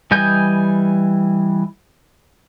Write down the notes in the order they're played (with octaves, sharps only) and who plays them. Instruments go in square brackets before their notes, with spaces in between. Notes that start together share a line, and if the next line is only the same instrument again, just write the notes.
[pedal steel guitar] E3 G3 D#5 G#5 G6